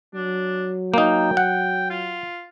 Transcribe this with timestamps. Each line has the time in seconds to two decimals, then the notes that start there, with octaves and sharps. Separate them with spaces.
0.15 F#3 D4
0.94 A#3 D#4 G5
1.37 F#5
1.90 F4